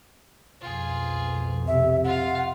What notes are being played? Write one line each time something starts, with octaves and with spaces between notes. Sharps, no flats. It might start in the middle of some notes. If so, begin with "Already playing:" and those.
B1 F2 F4 G#4
C3 E5
F4 F5 F#5